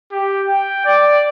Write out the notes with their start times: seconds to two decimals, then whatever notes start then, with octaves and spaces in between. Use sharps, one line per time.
0.12 G4
0.48 G5
0.85 D5